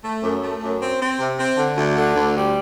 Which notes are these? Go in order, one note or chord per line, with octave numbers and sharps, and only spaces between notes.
A3
F#2
A3
F#2
C4
C4
C3
C4
D3
D2
D3
D2
G3